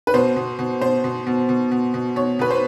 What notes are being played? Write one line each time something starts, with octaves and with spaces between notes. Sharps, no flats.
B4
B2 C5
B2
B2
B2 C5
B2
B2
B2
B2
B2
B2 C#5
B2 B4
C5